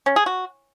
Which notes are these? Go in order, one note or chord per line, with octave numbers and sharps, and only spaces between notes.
C#4
G#4
F#4